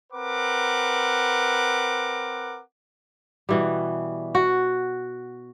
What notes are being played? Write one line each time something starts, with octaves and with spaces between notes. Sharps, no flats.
C4 A#4 B4 F#5 D6
B2 E3 G3
F#4